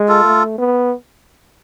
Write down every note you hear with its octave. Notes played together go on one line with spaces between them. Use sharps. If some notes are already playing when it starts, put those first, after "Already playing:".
Already playing: G#3
F4 A4
A3
B3